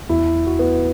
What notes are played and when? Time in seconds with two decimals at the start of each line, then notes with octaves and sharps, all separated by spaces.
0.09 E2 E4
0.47 F#4
0.59 B3